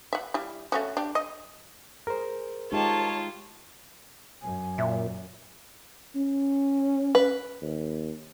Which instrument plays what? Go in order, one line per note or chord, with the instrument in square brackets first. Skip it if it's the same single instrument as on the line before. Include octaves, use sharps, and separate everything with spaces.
[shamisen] E5 F#5
G3 E4
A3 C#4 F#4
D4 G4
D#5
[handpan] G#4 [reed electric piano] A#4 C5
[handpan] G#3 D#4 G4 [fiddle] F4 [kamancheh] C#5 A5
[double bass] F#2 [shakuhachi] G#5
[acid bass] A#2 [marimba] E5
[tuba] C#4
[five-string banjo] B4
[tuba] D#2